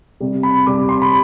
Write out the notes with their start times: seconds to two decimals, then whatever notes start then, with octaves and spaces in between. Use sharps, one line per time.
0.20 C3 G3
0.43 B5
0.67 C3 G3 D6
0.89 C6
1.02 B5